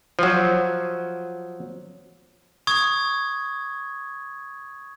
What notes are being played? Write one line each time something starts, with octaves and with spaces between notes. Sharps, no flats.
F3 F#3
C#6 D#6 G#6